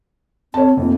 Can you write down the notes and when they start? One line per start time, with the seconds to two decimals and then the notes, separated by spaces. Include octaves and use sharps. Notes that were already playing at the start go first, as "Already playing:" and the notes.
0.54 C4 C#5 A5
0.77 F1 F2 A#3